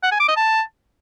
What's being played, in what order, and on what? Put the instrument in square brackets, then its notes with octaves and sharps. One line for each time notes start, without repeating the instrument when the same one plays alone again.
[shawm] F#5
G#5
D6
D#5
A5